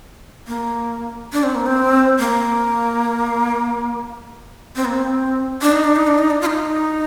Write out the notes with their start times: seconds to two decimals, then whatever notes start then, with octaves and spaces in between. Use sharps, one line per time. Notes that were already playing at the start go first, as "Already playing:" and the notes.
0.47 A#3
1.33 D4
1.43 C4
1.55 A#3
1.66 C4
2.19 A#3
4.76 C4
4.85 A#3
4.96 C4
5.62 D4
5.72 D#4
5.84 D4
5.96 D#4
6.07 D4
6.18 D#4
6.30 D4
6.41 F4
6.46 D#4